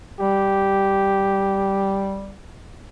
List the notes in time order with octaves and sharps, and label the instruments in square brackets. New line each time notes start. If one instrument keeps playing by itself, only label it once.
[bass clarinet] G3 [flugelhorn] G4